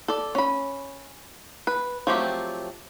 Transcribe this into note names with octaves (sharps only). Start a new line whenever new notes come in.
A4 D5
C#4 B5
B4
F3 F#3 A3 C4 G4